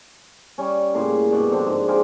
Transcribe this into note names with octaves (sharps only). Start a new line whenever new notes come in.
G3 C#4
A2 C#3 A#3 C6
G2 B2 D5
D3 F3 C4 D4
G#2
F4 G4 G#4 A#4